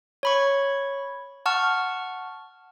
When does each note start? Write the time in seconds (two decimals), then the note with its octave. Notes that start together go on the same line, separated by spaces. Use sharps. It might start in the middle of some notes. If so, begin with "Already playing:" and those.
0.23 C#5 B5 C#6
1.46 F#5 A5 C#6 F6